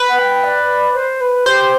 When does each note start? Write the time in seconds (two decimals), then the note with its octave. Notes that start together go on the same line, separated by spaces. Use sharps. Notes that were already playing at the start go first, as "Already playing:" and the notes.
Already playing: B4
0.08 F#5
0.18 G5
0.44 D5
0.94 C5
1.21 B4
1.46 G4 C5